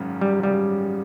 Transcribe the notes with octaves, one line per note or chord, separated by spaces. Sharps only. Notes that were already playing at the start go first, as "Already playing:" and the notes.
Already playing: G#1 F#2 C#3
G3
G#1 F#2 C#3 G3